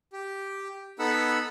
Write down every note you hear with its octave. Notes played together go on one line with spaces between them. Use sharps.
G4
B3 D#4 A4 F#5 B5 E6